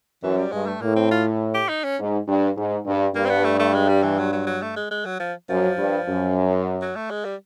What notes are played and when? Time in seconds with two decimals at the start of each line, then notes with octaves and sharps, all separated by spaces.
0.23 F#2 E3
0.37 G3
0.52 G2 G#3
0.66 A3
0.81 A2 A#3
0.96 C4
1.11 F4
1.54 G4
1.69 D#4
1.84 C#4
1.98 G#2
2.28 G2
2.57 G#2
2.86 G2
3.15 G2 A#3
3.25 C4
3.29 B3
3.44 A3
3.59 A3
3.74 G#3
3.88 G3
4.03 E3
4.18 F#3
4.32 F#3
4.46 F#3
4.62 A3
4.76 G#3
4.91 G#3
5.05 F#3
5.20 F3
5.49 F#2 F3
5.78 G2
6.08 F#2
6.81 F#3
6.96 A3
7.10 G#3
7.25 G3